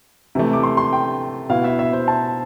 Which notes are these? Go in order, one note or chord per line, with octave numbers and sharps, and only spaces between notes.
C3 E3 A3
D6
C6
C6
G5
B2 B3 E4 F5
E5
E5
C5
A5